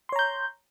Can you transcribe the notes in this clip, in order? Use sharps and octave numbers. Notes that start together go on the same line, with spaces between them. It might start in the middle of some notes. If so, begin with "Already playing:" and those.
C#5 A#5 C6 G6